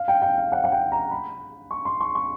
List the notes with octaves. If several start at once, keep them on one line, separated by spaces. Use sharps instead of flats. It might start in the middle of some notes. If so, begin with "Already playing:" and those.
Already playing: F5
G5
G5
F5
F#5
F#5
G5
A#5
B5
C#6
C6
C#6
C#6